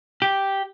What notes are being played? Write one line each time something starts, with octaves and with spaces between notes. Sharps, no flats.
G4